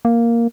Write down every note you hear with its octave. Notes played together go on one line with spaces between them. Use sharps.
A#3